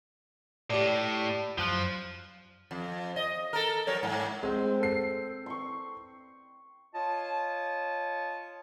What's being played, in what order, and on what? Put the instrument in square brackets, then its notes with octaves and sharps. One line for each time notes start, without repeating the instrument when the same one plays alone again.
[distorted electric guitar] A2 [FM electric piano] G4 D5
[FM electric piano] F#2 F#6 [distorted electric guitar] F3
[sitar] F2
D#5
A4 A#4
F#3 A#4 C#5
G#2
[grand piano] G#3 [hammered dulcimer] C4 G5
[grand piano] A4 C7
[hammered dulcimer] C6 C#6
[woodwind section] F4 C#5 D#5 A5